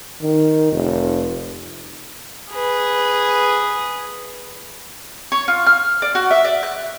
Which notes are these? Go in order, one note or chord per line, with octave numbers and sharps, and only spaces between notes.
D#3
F1
G#4 B4
C#5
F4
F6
D5
F#4
E5
D5
F#6